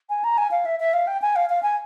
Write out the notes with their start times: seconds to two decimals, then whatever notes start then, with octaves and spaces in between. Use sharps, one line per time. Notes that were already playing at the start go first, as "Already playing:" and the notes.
0.10 G#5
0.24 A#5
0.38 G#5
0.51 F5
0.65 E5
0.80 E5
0.93 F5
1.07 G5
1.22 G#5
1.36 F5
1.49 F5
1.63 G#5